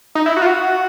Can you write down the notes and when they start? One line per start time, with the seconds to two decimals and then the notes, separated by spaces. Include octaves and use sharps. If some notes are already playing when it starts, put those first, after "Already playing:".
0.15 D#4
0.26 E4
0.36 F#4
0.42 F4
0.47 F#4